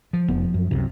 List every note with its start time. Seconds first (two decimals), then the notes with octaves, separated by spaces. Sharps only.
0.13 F3
0.28 F1 B3
0.54 F#2
0.71 C2 F#2 C3